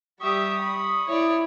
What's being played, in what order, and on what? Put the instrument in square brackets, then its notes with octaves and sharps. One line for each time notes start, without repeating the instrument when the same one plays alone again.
[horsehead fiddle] G3 [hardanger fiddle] G4 E5 [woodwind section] C#6 D#6
[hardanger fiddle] B5
[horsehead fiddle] E4 [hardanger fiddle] C#5 D5